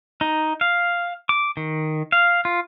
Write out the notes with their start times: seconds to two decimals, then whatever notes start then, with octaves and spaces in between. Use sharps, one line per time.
0.21 D#4
0.61 F5
1.29 D6
1.57 D#3
2.12 F5
2.45 F4